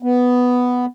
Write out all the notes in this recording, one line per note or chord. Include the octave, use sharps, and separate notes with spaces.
B3